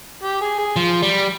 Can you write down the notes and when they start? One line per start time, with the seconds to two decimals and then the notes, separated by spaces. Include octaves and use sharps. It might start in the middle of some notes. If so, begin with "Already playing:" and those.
0.24 G4
0.42 G#4
0.59 G#4
0.76 F3
1.02 G3